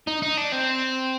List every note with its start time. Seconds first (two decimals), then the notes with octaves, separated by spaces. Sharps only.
0.08 D#4
0.22 D#4
0.38 D4
0.52 C4